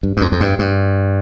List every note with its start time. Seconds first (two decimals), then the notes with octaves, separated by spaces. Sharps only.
0.03 G2
0.17 G2
0.21 F2
0.32 F2
0.40 G2
0.59 G2